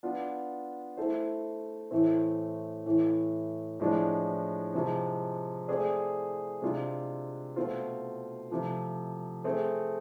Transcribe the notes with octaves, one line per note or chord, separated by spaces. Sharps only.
B3 D4 F4
A3 E4 A4 C5
A2 E3 A3 C4
A2 E3 A3
A2 F3 G#3 D4
C3 F3 G#3
A3 C4 G#4 D5
C3 G#3 D4 F4
B2 A3 C4 F4
C3 F3 A3
A3 C4 G#4